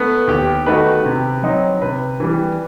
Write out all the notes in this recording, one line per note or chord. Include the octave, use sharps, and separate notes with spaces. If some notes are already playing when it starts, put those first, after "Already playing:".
Already playing: A3 B3
D#2 G4
D#3 A3 D#4 F#4 B4
C3
F#3 C4 D#4
C3 B4
E3 G3